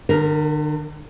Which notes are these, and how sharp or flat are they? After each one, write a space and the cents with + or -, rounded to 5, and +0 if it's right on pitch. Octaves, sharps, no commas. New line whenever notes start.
D3 +45 A#4 +0